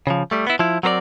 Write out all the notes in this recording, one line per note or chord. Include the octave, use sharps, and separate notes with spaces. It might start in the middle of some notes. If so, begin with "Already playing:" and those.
C#3 F3
G3 A3
B3 E4
F3 E4
F#3 C4 A#4 C5 D5